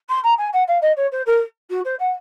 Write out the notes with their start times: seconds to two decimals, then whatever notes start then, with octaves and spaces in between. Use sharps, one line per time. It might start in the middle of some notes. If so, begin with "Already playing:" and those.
0.09 C6
0.23 A#5
0.38 G#5
0.53 F#5
0.68 F5
0.82 D#5
0.96 C#5
1.12 C5
1.26 A#4
1.70 F#4
1.85 C5
1.99 F#5